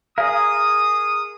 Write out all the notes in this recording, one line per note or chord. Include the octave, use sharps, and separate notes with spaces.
G#4 A#4 D5 F5 D#6